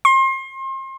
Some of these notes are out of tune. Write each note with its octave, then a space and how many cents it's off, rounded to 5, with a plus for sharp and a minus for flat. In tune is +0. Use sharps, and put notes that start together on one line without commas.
C6 +35